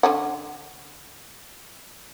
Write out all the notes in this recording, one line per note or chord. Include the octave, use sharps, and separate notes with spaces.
D3 C#4 F#5